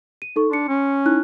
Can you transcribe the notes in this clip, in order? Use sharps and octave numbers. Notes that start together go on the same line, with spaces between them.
D#7
D#4 A4 C#6
D4 C6 C#7
C#4
D#4 E4 F#6